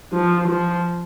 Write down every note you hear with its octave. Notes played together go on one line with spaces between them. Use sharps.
F3
F3